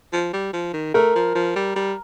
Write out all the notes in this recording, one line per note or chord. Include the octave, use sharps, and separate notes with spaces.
F3
G3
F3
D#3
A3 A#4
F3
F3
G3
G3